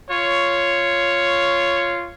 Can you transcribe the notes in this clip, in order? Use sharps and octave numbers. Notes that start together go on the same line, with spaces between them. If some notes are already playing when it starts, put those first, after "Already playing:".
F4 C#5